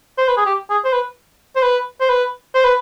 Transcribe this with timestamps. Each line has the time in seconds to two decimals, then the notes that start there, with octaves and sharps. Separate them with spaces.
0.18 C5
0.28 B4
0.37 G#4
0.46 G4
0.70 G#4
0.85 C5
0.93 B4
1.56 C5
1.63 B4
2.00 C5
2.09 B4
2.54 C5
2.64 B4